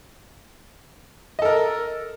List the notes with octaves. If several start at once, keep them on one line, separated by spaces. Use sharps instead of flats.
A4 A#4 D#5